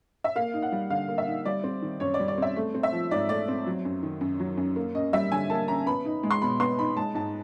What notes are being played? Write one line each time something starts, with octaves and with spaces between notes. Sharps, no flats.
E5
A#3 F5
D#4
F#5
G3
D3 F5
A#3
E5
D#4
G3 D5
C4
D#3
F#2 C#5
D5
G3
D5
C4 E5
A3
C4
E5
F3
G#2 D5
A3 D5
C4
F#3
F#2
D#3
F#2
F#3
F#2
A#3
C#4 D#5
G3 E5
D3 G#5
A#3 A5
C#4 A#5
B3 B5
D#4
G#3
C6
B2 B5
B3 C6
D#4 B5
G#3 A5
G#2 A5